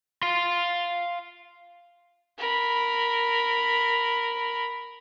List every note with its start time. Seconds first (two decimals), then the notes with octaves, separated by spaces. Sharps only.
0.23 F5 C6
2.39 A#4 B5